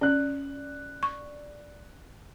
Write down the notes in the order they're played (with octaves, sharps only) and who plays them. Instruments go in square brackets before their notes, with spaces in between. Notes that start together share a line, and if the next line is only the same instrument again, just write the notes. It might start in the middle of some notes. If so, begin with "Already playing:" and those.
[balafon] C#4 [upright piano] D5 F#6
[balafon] C#6